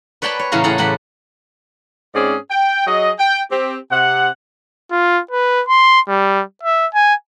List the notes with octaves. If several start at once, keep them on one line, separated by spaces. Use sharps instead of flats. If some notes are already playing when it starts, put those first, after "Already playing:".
B4 C#5 D5 G5 A5 B5
C#5
E2 A2 C#3 C#4 F5 A#5
A2 G#4 A4 F#5 A#5
E2 A2 G4 F#5 B5
G#2 C4 C#4 G#4 D5
G5
F#3 G#4 D#5
G5
C4 G4
C3 F#5
F4
B4
C6
G3
E5
G#5